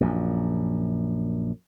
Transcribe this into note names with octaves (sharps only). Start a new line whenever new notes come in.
A#1 F#2